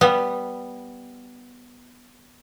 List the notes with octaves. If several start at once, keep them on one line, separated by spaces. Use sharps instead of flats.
G3 B3